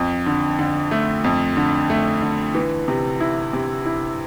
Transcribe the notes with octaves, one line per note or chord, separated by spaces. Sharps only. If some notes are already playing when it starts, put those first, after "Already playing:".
Already playing: F2
D3
D3
A3
F2
D3
A3
D3
E3
C3
E4
C3
E4